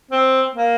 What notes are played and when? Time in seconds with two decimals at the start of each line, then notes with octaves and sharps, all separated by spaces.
0.11 C4
0.55 A#3